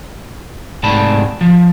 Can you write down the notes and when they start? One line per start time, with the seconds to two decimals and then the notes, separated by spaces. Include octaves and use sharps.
0.83 G#2 C3 A3 D5 A5 B5
1.41 F3